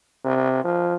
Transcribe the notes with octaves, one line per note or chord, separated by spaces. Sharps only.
C3
F3